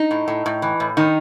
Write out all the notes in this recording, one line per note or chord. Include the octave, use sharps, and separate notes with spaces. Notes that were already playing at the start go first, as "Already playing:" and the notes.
Already playing: D#4
A2
A2
A2
E3
A2
D#3 D#4